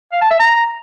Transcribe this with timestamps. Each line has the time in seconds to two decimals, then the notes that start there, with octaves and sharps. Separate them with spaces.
0.13 F5
0.22 A5
0.31 E5
0.40 A#5